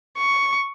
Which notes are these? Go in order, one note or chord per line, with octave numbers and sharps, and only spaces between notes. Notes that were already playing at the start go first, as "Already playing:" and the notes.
C#6